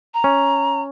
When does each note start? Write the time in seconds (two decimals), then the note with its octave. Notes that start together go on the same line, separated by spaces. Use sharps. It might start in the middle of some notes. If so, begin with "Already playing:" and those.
0.14 A#5
0.24 C#4